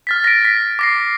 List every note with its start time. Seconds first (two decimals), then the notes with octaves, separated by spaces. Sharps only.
0.07 F6 A6 B6
0.24 A#6 B6 D7
0.45 B6
0.79 D6 A#6 C7